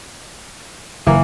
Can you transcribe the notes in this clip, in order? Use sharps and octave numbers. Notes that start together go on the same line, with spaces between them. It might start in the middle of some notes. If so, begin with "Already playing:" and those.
F#1 E3 A#3